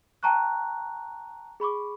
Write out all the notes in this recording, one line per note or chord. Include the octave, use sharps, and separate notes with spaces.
G5 A5 A#5 C#6 F#6
G#4 B5 C#6 D6